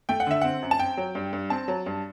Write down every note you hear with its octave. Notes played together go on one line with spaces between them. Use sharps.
A3 G5
F#5
D3 E5
C4 F#5
F#2
A5
C4 G5
F#3
G2
G2
C4 A5
F#3
G2